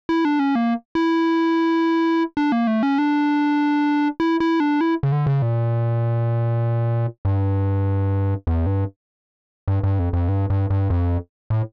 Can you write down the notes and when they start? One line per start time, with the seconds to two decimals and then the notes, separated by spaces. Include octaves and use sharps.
0.09 E4
0.25 D4
0.39 C#4
0.55 A#3
0.95 E4
2.37 D4
2.52 A#3
2.67 A3
2.83 C#4
2.98 D4
4.20 E4
4.40 E4
4.60 D4
4.81 E4
5.03 C#3
5.12 D3
5.27 C#3
5.42 A#2
7.25 G2
8.47 E2
8.66 G2
9.68 G2
9.83 G2
9.99 F2
10.13 F2
10.28 G2
10.50 G2
10.70 G2
10.90 F2
11.50 A2